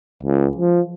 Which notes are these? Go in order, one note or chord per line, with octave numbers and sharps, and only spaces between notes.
C#2
F3